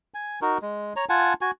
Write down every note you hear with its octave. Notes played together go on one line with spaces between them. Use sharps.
G#5
D#4 F#4 A#4
G#3
C#5 A#5
F4 F#5 G#5 A5
F#4 G#5